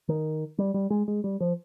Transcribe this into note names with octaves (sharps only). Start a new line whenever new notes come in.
D#3
G3
G3
G#3
G#3
G3
F3